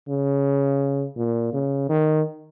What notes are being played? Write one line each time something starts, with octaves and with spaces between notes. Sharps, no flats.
C#3
A#2
C#3
D#3